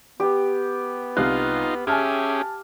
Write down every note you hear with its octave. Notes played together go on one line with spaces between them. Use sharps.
B3 G4
C2 D#4 F4 F5 F#6
C#4 G4 G#4 E5 G#5 A5 F6